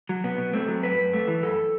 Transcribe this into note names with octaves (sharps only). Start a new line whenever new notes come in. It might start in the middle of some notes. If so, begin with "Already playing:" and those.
F#3
B2 B3
B2
A3 C4
F#3
F#2 B4
F#2
A3
E3
F#2 A4